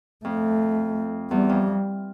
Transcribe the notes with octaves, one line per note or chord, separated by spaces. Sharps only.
F2 A3
E2 G3
F2